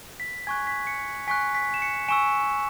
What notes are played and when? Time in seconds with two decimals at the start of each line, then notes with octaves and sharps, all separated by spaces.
0.20 B6
0.47 G#5 C#6 F#6 G#6
0.67 B6
0.87 C#7
1.28 G#5 C#6 F#6 B6
1.55 B6
1.74 E7
1.82 C#7
2.08 G#5 C#6 E6 E7